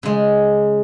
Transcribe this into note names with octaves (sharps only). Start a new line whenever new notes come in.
C#3 G#3